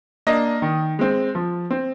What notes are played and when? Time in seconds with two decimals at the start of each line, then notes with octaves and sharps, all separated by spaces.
0.27 A#3 D4 D#5
0.62 D#3
0.99 G#3 C4
1.35 F3
1.70 C4